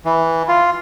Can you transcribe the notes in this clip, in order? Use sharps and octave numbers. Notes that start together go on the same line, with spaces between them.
E3
F4